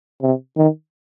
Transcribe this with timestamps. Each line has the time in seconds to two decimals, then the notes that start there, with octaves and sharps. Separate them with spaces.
0.22 C3
0.57 D#3